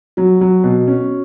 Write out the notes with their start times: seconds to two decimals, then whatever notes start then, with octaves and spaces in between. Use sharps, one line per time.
0.17 F#3 F#4
0.41 F#3
0.64 B2
0.88 C#4